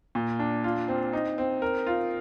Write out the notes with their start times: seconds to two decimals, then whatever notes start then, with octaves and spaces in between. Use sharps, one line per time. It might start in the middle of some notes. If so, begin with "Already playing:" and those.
0.15 A#2
0.39 D4
0.64 F4
0.88 C4
1.13 D#4
1.38 C4
1.62 A#4
1.87 F4